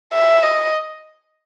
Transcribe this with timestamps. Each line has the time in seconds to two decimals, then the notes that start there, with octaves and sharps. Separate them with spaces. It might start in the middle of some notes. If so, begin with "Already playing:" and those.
0.13 E5
0.43 D#5